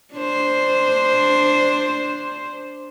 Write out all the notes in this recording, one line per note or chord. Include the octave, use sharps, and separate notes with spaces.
D4 C5